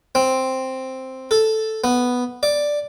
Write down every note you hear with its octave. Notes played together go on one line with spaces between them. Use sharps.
C4
A4
B3
D5